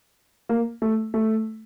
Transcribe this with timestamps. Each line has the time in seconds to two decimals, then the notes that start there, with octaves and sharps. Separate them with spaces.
0.49 A#3
0.82 A3
1.14 A3